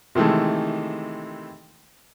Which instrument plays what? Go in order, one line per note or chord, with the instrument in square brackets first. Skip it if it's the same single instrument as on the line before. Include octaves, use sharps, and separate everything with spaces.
[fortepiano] C3 D#3 E3 G#3 A3